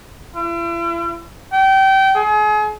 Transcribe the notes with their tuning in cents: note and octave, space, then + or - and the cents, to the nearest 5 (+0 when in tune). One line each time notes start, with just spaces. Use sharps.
E4 +45
G5 -25
G#4 +35